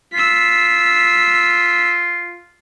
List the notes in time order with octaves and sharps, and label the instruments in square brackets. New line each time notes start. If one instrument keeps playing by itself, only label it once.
[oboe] F4 [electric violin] E6 B6